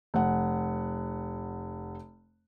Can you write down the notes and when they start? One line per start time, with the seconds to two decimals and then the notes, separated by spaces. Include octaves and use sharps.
0.14 F1 F#5